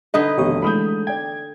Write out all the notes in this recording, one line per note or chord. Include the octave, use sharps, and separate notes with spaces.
D3 D#4 B4 D#5
F1 B2 D#3 G4 C#5 D#6
E3 G#3 A3 B5 D#6 G6
D5 G5 G#6